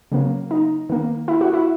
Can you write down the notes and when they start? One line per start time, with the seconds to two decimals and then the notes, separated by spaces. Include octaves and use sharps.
0.12 C#3 F#3 A#3
0.51 D#4
0.90 D#3 A#3
1.28 E4
1.41 F#4
1.53 E4